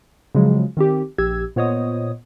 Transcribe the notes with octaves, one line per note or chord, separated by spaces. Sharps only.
C#3 F3 F#3 G#3
D#3 C4 G4
A#1 G4 E6 G#6
A#2 B3 C5 C#5 D#5 D#6